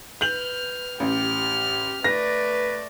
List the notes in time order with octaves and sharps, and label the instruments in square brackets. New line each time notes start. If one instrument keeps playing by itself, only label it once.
[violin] B4 F6 [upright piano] G6 F7 F#7
[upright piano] A1 [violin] G4 F6
[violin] A3 D5 [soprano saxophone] B4 [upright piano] A#6